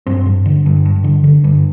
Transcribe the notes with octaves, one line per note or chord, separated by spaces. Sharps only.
G2 C4
G2
D3
G2
G2
D3
D3
G2